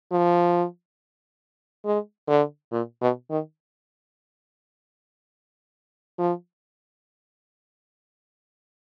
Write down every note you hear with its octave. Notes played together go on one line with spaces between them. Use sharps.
F3
G#3
D3
A#2
B2
D#3
F3